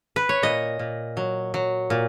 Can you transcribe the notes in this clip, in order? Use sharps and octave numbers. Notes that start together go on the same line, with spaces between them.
B4
C#5
A#2 D#5
A#2
F#3
F#3
A#2